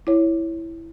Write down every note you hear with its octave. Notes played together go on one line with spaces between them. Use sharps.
E4 C#5